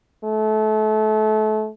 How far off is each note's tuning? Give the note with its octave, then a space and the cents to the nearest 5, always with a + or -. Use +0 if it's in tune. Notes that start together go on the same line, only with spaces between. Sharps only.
A3 -30